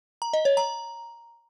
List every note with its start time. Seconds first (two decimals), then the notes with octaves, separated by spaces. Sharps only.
0.22 A#5
0.33 D#5
0.45 C#5
0.57 A#5